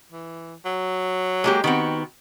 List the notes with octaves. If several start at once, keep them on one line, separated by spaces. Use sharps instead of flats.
E3
F#3
G#3 A#3 G4
D#3 B3 C4 F#4